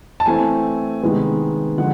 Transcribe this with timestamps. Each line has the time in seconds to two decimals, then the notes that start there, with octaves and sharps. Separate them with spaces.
0.20 A5
0.26 E3 A3 C4 G#5
1.03 C3 D#3 G#3 B3
1.78 D3 F3 G#3 F#5